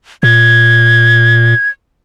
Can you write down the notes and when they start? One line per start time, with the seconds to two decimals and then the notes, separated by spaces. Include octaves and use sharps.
0.23 A#2 G#6